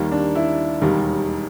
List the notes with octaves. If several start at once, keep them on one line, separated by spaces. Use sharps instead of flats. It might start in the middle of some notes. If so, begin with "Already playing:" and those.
Already playing: D#2 D#3 G3 A#3
D4
E4
E1 D#2 D#3 G3